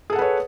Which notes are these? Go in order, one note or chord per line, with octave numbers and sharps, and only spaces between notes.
G#4 A4 B4 C#5 F#5